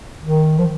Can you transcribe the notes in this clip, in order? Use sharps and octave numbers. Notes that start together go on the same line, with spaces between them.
D#3
F3